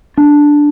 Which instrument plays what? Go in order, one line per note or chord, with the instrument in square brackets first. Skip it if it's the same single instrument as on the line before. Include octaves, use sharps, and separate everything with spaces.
[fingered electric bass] D4